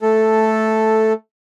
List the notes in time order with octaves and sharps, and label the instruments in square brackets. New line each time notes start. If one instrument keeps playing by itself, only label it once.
[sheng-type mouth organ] A3 A4